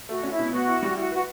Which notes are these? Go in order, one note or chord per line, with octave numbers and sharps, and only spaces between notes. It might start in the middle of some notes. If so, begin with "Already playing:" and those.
A3 F#4
C#4 F#4
E4
B2
B3 F#4
E4
G3
E4 F#4
F#4 B4